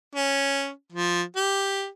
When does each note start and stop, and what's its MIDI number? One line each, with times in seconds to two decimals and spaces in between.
0.15 0.69 61
0.92 1.22 53
1.36 1.86 67